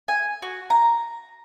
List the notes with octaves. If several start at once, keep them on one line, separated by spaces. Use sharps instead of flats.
G#5
F#4
A#5